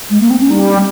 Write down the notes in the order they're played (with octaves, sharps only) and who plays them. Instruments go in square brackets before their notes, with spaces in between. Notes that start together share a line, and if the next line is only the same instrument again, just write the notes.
[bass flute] G#3
A#3
C4
C#4
[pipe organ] G3 [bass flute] D#4